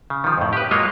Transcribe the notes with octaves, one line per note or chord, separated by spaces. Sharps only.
C#3
D#3 F3
F2 A2
G4 B4
F#3 G#3 A#3 F4 C#5 D#5